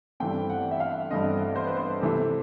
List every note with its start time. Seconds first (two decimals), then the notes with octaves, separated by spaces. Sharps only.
0.20 G2 E3 A3 C4 G5
0.50 F#5
0.71 E5
0.80 F5
1.10 G2 E3 A3 C4 D#5
1.56 C5
1.67 B4
1.77 C5
2.01 C3 E3 A3 C4 A4